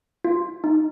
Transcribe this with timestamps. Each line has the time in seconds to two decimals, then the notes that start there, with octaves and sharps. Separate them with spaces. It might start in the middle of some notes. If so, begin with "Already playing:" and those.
0.24 F4
0.64 D#4